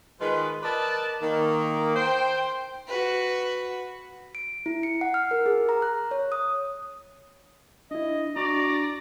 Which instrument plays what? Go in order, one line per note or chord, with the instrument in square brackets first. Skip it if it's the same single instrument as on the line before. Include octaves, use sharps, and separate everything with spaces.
[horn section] D#3 G#3 F4 B4
A#4 B4 D5 D#5 A5
D#3 A#3
C5 G5
[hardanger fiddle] F#4 B4
[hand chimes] D7
E4
C#7
F#5
F6
A#4
G#4
A#5
F#6
C#5
D#6
[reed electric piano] D4 E4 [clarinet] D#5
[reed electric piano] D4 [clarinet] F#4 [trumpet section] D5 [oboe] A#5